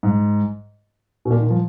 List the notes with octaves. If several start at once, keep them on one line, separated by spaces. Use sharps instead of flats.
G#2
B2
A#2
D#3
F3